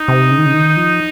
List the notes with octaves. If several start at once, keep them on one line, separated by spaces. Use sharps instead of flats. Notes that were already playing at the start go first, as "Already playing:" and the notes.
Already playing: D#4
C3
C#3
D#3
C#3
D#3
F3